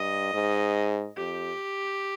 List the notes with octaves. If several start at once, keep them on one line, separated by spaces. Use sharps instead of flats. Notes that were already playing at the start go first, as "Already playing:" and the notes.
Already playing: G2 D#5
G#2
F2 G4